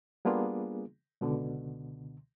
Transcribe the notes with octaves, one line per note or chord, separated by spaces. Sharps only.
G3 A#3 B3 D4 F4 G#4
C#2 B2 D3